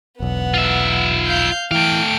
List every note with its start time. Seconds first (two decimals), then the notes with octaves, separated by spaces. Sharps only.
0.20 E1 B1 B3 F#5
0.54 F4 E5
1.26 F5 G6
1.71 E3 A3 F5 G5 D7